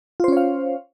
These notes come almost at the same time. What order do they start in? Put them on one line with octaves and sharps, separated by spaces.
F4 C5 C#4 C#5 F5